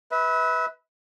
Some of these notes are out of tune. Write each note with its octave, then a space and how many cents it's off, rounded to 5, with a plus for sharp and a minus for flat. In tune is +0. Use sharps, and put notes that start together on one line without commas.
B4 +0 E5 -35